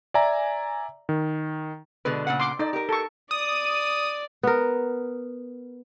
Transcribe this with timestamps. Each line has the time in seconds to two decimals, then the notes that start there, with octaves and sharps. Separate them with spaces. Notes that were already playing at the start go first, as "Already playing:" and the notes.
0.14 D5 E5 G#5 A#5
1.09 D#3
2.05 B2 D3 G#3 B4
2.27 A#2 C#3 F#5
2.40 C6 D6
2.59 D#4 A4 D5
2.73 G4 A#4
2.89 A4 C#6
3.31 D5 D#6
4.43 B3 A#4